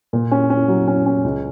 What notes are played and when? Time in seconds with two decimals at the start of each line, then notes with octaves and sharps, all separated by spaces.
0.13 A#2
0.31 C#4
0.50 C#4
0.68 F#3
0.88 C#4
1.06 C#4
1.24 C#2